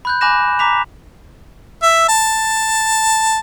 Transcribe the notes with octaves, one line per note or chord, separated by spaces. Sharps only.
B5 F#6 G6
G#5 B5 D6 F#6 A#6 E7
A#5 D6 B6 F7
E5
A5